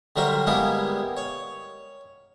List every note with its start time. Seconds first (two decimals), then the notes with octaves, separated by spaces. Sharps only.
0.16 D3 F#3 G3 A#4 C5 E5
0.46 G3 G#3 A#3 B3 E4 G#4
1.17 C#5